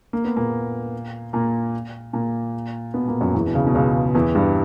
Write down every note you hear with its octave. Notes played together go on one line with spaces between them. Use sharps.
A#3
B3
A#2 A#3
A#2 A#3
A#2 A#3
B2 B3
A#2 A#3
F#2 F#3
E2 E3
B2
C#2 C#3
B2
C#2 C#3
E2 E3
G2 G3